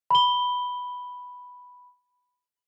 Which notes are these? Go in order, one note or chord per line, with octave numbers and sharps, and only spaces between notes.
B5 G7